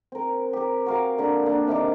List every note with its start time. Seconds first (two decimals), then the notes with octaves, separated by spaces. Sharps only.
0.12 C4 A#4
0.53 G4 A#4
0.86 F#4 A#4 F5
1.18 D3 A#3 D4
1.46 A#3 D4
1.67 C3 D#3 D4 D6